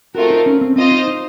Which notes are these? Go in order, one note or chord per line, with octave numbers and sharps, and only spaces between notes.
A3 C4 F4 F#4 A#4
D#4
C#4
C4
C4 F4 C5 D#5
D#4
D#4